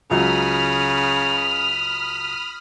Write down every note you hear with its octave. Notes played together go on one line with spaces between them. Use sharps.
C#2 C#3 F#3 B5 D#6 F6 F7